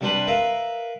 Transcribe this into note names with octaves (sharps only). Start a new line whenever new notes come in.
C3 G3 D4 B4 C5 B5
A#4 B4 E5 F5